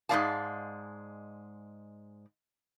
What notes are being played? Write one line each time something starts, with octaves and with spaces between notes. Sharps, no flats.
G#2 G#3 A3 D5 F5 A5